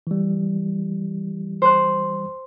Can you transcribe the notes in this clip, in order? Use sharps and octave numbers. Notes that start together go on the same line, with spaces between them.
E3 G3
C5 F#6